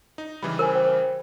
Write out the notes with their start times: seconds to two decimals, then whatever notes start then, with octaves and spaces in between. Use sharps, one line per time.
0.18 D#4
0.43 C#3 E3 G3 B5
0.59 A#4 C5 G#5
0.75 C5 G5